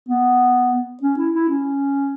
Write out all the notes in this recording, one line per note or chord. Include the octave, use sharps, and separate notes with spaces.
B3
C#4
E4
E4
C#4